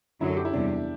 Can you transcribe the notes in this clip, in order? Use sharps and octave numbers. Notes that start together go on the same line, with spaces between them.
F#2 D3 F#3 E4
A4
G4
E4
E2 C3 G3 D4